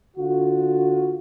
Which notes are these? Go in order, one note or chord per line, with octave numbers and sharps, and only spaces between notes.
D3 F4 F#4